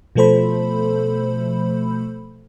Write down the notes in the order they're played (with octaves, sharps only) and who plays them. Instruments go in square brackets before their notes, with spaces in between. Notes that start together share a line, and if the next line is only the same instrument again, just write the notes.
[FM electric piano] B2 F3 A3 A4 C5 B5